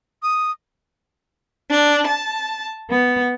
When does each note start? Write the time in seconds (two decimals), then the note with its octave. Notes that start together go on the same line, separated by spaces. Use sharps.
0.23 D#6
1.72 D4
2.07 A5
2.91 B3